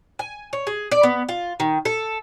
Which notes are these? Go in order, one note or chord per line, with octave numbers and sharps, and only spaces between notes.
G#5
C#5
G#4
D5
B3
F4
D#3
A4